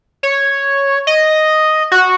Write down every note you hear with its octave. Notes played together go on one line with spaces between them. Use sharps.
C#5
D#5
F#4